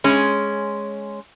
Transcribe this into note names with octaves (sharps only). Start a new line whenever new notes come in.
G#3 C#4